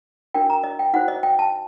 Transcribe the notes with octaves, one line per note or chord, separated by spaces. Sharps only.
D4 F#4 A#4 G5
A#5
D#5
G5
D#4 F#4 C5 F#5
D#5
G5
A5